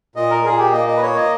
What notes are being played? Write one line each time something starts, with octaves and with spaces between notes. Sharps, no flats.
A#2 D#5
A#4
A#2 G#4
G4
A#3 D#5
D#5
B4
A#3 C#5
D#5